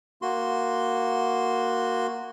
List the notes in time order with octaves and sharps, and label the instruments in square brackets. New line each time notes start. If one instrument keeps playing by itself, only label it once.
[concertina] A#3 F#4 C6